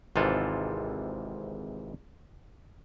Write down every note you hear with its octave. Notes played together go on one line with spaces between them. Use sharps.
G#1 G#2 C3 E3 F4 A4